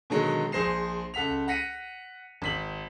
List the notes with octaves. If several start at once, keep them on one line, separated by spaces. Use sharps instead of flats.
B2 D3 D#3 F#3 G#3
A#1 G#4 C5 A#6 C7 E7
C#2 A4 F#5 B6 F7
F#5 A#6 B6 C#7 D#7
G#1 B6 F#7